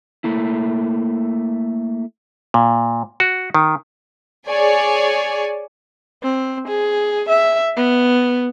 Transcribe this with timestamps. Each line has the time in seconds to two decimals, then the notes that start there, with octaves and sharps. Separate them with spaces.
0.24 A3 A#3 E4
2.54 A#2
3.20 F#4
3.54 D#3
4.46 G#4 C#5 D5 G#5
6.23 C4
6.68 G#4
7.29 E5
7.77 B3